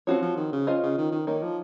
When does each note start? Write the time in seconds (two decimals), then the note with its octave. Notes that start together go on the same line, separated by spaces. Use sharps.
0.07 F3 C4 F#4 C#5
0.22 F3
0.37 D#3
0.52 C#3
0.67 C#4 F4 C5 D#5
0.83 C#3
0.98 D#3
1.12 D#3
1.27 D#3 A#3 D#4 A#4 C#5
1.43 F3